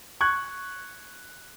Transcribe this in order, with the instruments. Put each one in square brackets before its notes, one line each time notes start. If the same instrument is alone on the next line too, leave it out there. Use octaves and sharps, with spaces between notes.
[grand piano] C#6 F#6 G#6